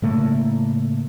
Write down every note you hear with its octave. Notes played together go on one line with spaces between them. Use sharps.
A2 C#3 A3 A#3